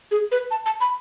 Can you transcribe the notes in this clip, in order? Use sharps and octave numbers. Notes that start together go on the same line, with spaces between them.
G#4
B4
A5
A5
B5